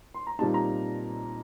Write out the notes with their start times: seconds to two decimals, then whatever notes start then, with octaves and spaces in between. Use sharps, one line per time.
0.14 C6
0.27 A#5
0.39 A#2 G3 C4 D#4 A5
0.54 A#5